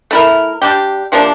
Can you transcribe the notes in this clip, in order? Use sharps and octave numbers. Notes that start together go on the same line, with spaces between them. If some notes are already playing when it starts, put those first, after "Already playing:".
A3 E4 A#4
G3 D4 G4
C3 F3 A#3 D4